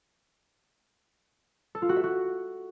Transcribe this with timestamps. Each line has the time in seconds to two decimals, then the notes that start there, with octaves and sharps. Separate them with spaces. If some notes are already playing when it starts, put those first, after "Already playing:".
1.75 A4
1.82 F4
1.89 F#4
1.96 E5
2.04 F#4